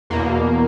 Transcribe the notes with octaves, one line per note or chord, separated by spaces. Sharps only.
E2 B2 A#3